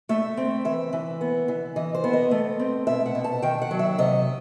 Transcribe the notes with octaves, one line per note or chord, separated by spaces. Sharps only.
A3 E5
C4
E3 E5
E3
B3
E3
E3 D#5
C5
B3
D#5
A3
C4
B2 E5
F#5
B2
A5
D#3 G5
F#5
F#3
E5
C3 D#5